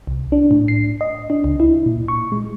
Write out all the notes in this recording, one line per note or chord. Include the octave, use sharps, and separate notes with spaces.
C2
D4
A2
C7
D#5
D4
C#2
E4
A#2
C#6
G#3